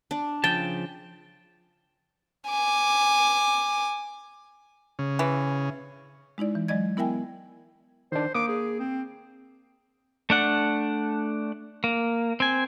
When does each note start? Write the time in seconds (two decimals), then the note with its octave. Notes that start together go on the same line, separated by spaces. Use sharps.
0.11 D4
0.44 C#3 F3 G5 A5
2.50 G#5 D6
4.99 C#3
5.19 E3
6.38 G#3 D#4 E4 D5
6.55 E3
6.68 F#3 G#3 D5 D#5 G#6
6.97 B3 E4 A#4 E5 G5 G#5
8.12 D#3 D4 C5
8.34 A#3 D6 D#6
8.48 G#4
8.79 C4
10.30 A3 D4 F#5
11.84 A#3
12.40 C4 G#5